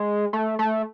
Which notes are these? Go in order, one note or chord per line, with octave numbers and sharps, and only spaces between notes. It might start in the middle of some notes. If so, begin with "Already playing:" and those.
Already playing: G#3
A3
A3